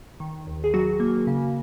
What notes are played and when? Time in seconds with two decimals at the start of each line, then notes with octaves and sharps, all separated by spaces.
0.20 D#3
0.47 D#2
0.64 G#4
0.74 F#3 F#4
1.00 A#3
1.27 C#3